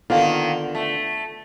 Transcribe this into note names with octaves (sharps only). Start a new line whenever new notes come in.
D3 D#3 A#3 B3 F4
A3